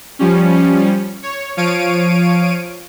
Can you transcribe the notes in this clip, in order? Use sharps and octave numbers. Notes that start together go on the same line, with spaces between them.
F3 G3 C#4
C#5
F3 C#5 F5 D7 D#7